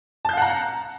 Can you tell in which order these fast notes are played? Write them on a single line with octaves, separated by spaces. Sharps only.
A5 G6 F5 F#5 A#5